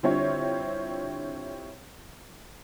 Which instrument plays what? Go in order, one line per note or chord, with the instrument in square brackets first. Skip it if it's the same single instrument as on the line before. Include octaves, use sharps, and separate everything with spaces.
[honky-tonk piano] D3 G3 C4 E4 F4 C#5